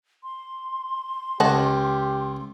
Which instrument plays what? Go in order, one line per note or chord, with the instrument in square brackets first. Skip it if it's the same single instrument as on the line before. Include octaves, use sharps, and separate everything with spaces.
[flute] C6
[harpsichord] C#2 [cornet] G4 [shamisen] D#5 F#5 A5